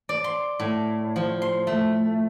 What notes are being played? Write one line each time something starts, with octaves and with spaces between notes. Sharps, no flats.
D5
C6
A2
F3
C6
A3